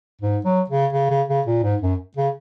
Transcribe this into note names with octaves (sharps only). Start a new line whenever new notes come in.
G#2
F#3
C#3
C#3
C#3
C#3
A#2
G#2
F#2
C#3